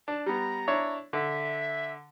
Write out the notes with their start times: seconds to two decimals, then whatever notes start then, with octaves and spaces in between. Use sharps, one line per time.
0.08 D4 A5
0.26 G3 B3 A#5
0.68 D4 E4 C#5
1.13 D3 E5